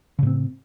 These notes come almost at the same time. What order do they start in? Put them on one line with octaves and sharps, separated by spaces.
C#3 A2 C4